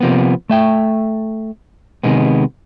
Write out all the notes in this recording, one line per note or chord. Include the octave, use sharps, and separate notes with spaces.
C3 F3 A#3 B3
A3 E5 G5
C3 D#3 G#3 B3